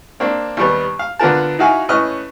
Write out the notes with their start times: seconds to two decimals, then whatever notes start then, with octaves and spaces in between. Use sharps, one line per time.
0.20 A#3 C4 D4
0.57 D#2 G3 B3
0.99 F5
1.19 D3 B3 F4 A#4 A5
1.59 D#4 E4 F#4 F5 G#5
1.89 A2 C#4 B4 D#5 F6